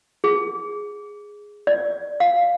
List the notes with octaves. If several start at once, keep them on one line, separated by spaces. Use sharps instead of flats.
G#4
D5
F5